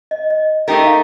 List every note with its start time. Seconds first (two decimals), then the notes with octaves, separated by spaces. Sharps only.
0.11 D#5
0.30 D#5
0.68 A3 D#4 G4 A#4 D#5
0.86 F5